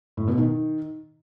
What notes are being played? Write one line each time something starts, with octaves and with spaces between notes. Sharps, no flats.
A2
B2
D#3